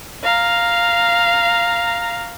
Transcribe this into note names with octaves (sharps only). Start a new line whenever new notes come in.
F5 A#5